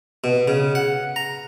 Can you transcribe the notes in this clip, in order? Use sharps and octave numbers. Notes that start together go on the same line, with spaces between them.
B2
C#3
F#5
A#5